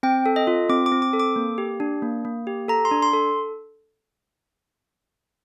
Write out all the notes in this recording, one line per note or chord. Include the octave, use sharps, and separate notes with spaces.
C4 G5
A4
D#5
F4
C4 D6
D6
C4
D6
A4
D6
A#3
G4
D4
A#3
A#3
G4
A4 A#5
C6
D4
C6
A4